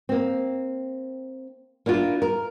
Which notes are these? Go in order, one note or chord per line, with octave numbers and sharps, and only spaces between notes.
A#3 C4
A#3 D4 E4 F4
A#4